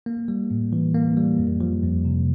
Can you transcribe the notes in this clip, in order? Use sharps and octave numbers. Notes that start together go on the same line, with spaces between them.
A#3
G3
A2
E3
A#3
G3
F2
F3
F2
C3